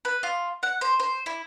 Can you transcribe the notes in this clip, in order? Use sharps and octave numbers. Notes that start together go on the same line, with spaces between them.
B4
F4
F#5
C5
C5
E4